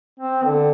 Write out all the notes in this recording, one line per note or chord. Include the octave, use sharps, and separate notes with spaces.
C4
D3